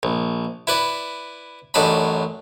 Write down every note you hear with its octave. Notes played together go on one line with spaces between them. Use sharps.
A#1
E4 B4 D5
A1 F#2 D4 D#5 B5